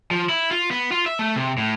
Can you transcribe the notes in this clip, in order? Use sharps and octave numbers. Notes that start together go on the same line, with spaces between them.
F3
E4
F4
B3
F4
E5
A3
C3
A2